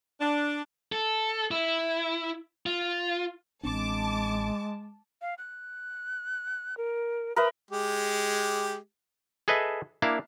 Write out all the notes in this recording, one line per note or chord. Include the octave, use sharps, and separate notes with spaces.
D4
A4
E4
F4
A1 G#3 C4 D4 A5 D6
F5
F#6
A#4
A#4 B4 E5 D#6
G#3 G4
G#4 A4 B4 D#5 E5
A#3 D4 E4 F5